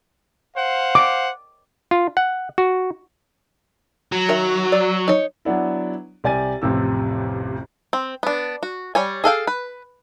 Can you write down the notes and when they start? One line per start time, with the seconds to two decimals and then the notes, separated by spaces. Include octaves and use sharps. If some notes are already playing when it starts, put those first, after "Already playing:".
0.57 C5 F5 F#5
0.95 D6
1.91 F4
2.17 F#5
2.58 F#4
4.12 F#3
4.29 D#3 A#4 E5
4.72 D5
5.08 D#4 C#5
5.45 F#3 B3 D4 E4
6.24 C2 G4 D5 G#5 A6 D#7
6.62 A1 F2 C3 E6
7.93 C4
8.23 B3 D4
8.63 F#4
8.95 G3 C#5 G#5
9.24 G#4 A4 F5 G5
9.47 B4